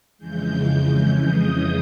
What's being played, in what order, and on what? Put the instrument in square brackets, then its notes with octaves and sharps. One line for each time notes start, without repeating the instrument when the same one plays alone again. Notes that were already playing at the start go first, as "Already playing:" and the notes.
[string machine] F2 C#3 E3 G#3 G6
G6
D#6